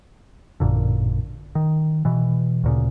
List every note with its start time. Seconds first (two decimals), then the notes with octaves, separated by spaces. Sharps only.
0.60 A1 F#2 A#2 D3
1.55 D#3
2.05 B2 E3
2.64 D2 A#2 C#3